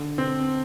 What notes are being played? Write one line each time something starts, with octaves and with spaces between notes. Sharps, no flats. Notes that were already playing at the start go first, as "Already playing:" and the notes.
Already playing: D3
C4